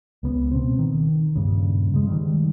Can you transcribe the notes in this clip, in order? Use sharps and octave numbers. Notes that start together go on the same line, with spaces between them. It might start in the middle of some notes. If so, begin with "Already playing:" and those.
C#2 C#3 B3
B2 C4
D#3
D#1 G#1 G2 C#3
C#3 G#3
D#3 G3